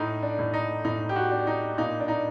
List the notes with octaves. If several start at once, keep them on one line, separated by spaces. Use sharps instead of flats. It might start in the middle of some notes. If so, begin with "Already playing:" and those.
Already playing: A2 D#4
D4
A2
D#4
A2 D#4
G4
F#4
D4
D#4
A#2 D#4
D4
D#4